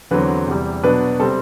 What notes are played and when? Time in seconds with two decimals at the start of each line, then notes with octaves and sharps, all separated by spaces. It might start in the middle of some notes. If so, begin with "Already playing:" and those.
0.11 E2 D3 F#3 C4 B4
0.47 E2 C3 G3
0.83 B2 F#3 B3 D4 B4
1.19 C3 G3 C4 A4